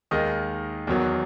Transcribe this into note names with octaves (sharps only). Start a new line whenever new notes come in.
D#2 D#3 G#3 D#5
E2 D#3 F#3